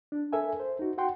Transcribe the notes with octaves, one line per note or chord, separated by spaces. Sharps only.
D4
A4 A#4 E5 G#5
C5
D#4 F#4
F#4 F#5 G5 C6